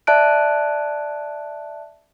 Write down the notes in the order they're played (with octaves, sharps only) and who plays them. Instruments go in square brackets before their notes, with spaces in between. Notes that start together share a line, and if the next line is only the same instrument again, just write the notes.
[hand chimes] D5 E5 A5 F#6 D7